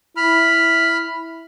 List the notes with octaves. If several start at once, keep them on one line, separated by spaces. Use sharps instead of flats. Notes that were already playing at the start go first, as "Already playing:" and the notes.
E4 B5 F6